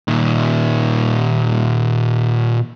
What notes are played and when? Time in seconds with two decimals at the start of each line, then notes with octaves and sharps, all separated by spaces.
0.08 A#2 D#3